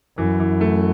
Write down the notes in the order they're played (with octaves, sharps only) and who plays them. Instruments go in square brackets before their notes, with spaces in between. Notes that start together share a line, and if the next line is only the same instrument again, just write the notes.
[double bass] F#2 [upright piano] E3
[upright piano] E3
A3